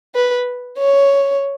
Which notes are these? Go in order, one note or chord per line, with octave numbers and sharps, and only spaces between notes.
B4
C#5